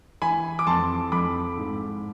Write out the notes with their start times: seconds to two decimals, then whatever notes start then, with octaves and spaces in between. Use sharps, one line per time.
0.22 E3 G#5 B5
0.59 D6
0.67 F2 A5 C6
1.12 F2 B5 D6
1.57 G#2